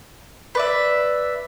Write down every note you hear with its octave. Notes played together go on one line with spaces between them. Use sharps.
B4 D5 E5